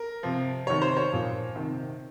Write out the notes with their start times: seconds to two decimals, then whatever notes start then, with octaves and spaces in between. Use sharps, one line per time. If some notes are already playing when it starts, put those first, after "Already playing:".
Already playing: A#4
0.23 C3 F3
0.67 C3 D#3 C#5
0.82 C5
0.97 C#5
1.11 A#2 F3
1.56 C3 D#3